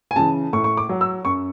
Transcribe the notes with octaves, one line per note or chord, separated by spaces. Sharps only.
G#5
C#3 E3 A5
A2 C#6
C#6
D6
F#3
E6
F#2 C#6